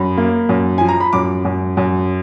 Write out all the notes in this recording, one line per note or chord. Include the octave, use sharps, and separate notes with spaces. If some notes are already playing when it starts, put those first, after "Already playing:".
Already playing: F#2 B5
A#3
F#2
F3 G#5
A#5
B5
F#2 D6
F#2
F#2